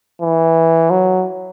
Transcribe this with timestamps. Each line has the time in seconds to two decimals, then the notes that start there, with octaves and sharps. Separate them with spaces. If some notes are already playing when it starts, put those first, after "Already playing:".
0.21 E3
0.90 F#3